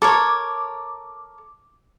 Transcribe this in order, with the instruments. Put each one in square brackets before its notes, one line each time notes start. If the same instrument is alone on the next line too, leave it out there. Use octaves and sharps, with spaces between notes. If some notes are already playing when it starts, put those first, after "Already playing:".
[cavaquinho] A4 A#4 C#5 [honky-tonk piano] D6